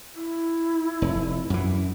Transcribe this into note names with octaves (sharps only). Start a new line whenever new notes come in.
E4
F1
F#2 E3